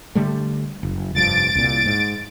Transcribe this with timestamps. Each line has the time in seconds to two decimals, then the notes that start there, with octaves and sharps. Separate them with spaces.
0.15 D3 G3 A3
0.83 F#1
1.15 F1 G2 F3 A6 D7
1.55 C2 A#2
1.86 G#2